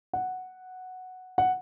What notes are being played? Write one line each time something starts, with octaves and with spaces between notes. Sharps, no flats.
F#5
F#5